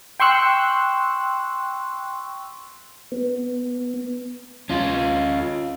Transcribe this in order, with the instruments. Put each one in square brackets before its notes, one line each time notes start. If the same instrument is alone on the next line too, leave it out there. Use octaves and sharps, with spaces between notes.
[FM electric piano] G5 C6 C#6 E6 F#6
[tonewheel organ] B3
[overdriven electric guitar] C#4 F4